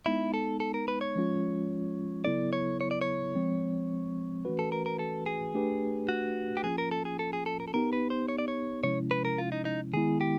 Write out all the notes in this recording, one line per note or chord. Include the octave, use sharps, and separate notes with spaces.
G#3 B3 D#4 E4
A4
A4
A#4
B4
C#5
F3 G#3 C#4 F4
C#3 F#3 B3 E4 A4 D5
C#5
C#5
D5
C#5
F3 G#3 C4
E3 A3 C#4 F#4 B4
A4
A#4
A#4
A4
G#4
A3 D4 G4 B4
F#4
G4
F3 A#3 C#4 F4 G#4
A#4
A4
G#4
A4
G#4
A4
A#4
A4
B3 D#4 G4 A#4
B4
C5
C#5
D5
C#5
C3 F3 G#3 C#4 E4 C#5
B4
A#4
F4
D#4
D#4
D#3 G#3 B3 E4 G#4
G4